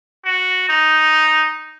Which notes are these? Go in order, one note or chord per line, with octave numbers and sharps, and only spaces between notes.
F#4
D#4